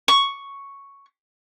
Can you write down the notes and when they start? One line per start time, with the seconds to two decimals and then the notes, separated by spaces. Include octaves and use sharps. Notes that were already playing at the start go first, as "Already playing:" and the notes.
0.08 C#6